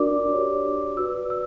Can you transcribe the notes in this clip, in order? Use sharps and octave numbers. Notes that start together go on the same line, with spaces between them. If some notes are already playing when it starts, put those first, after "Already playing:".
Already playing: D4 F#4 A#4 D5 D6
G4 C#5
F#4 B4 D5 E6
E6